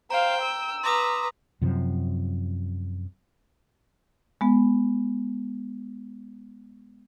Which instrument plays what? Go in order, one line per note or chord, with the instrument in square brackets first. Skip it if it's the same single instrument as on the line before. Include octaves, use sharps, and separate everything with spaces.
[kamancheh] C5 F5 [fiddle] G5 [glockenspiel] A#5
[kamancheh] E6
[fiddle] B4 A#5 [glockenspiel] C6 D6 D#6
[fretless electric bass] F#2 C3 F3
[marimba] G#3 B3